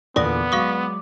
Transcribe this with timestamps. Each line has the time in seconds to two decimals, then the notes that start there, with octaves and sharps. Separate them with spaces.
0.16 E2 A#2 D3 B3 D5 D6 D#6 A#6
0.52 F#3 G#3 F5 C#6 D#6